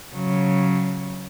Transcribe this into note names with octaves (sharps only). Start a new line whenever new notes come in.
C#3 F#3